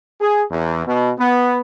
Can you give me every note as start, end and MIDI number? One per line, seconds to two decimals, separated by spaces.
0.20 0.43 68
0.51 0.84 40
0.86 1.11 47
1.19 1.61 59